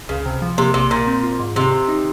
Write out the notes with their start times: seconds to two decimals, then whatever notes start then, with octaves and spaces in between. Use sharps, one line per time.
0.09 C#2 C#3
0.26 C3
0.42 F3
0.58 C3 A#3
0.74 A#1 C3
0.90 A#2 A#3
1.07 C4
1.23 F4
1.40 G#2
1.56 C3 D#3
1.72 D#3
1.88 D#4